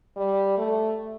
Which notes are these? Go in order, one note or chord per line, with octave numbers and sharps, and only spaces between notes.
G3
A3